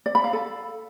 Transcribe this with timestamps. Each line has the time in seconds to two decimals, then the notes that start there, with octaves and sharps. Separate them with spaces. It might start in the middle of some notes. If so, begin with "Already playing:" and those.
0.06 D5
0.15 B5
0.24 F5
0.33 A4